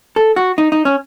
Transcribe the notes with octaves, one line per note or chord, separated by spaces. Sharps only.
A4
F#4
D#4
D#4
C#4